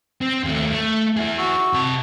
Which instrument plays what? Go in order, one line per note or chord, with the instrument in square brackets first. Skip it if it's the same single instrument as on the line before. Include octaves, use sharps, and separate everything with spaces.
[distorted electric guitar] C4
D#2 A3
A3
E4 G#4
[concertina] F#4 C#6 E6
[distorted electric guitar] C3 A5